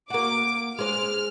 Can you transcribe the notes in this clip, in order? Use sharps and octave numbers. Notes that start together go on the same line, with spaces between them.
A#3 F#4 D6
G#3 C5 F6